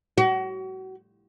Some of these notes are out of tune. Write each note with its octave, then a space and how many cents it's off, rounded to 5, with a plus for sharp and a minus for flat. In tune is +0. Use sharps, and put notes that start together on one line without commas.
F#4 +30